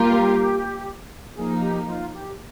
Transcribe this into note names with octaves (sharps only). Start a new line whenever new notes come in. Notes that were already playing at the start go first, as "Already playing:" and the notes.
Already playing: G3 A#3 F4 G4 A#4
F3 A#3 D#4 G#4
G4
F4
G4